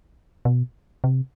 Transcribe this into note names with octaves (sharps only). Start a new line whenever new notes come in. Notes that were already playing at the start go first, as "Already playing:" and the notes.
B2
C3